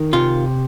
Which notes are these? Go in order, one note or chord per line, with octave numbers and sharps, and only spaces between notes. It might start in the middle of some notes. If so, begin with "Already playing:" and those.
Already playing: D#3
C3 F4